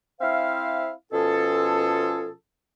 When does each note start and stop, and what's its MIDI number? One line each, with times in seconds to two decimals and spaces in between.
0.20 0.90 60
0.20 0.90 64
0.20 0.90 72
0.20 0.90 76
0.20 0.90 77
1.12 2.31 47
1.12 2.31 53
1.12 2.31 61
1.12 2.31 65
1.12 2.31 68
1.12 2.31 69